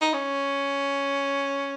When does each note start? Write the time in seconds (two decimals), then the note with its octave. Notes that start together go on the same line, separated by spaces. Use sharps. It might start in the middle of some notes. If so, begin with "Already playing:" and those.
0.01 D#4
0.14 C#4